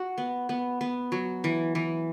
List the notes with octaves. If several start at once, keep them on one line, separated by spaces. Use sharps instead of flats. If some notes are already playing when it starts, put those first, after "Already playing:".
Already playing: F#4
B3
B3
B3
F#3
E3
E3